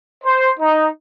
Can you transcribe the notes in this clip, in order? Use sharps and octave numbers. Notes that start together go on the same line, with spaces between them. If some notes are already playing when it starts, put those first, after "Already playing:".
C5
D#4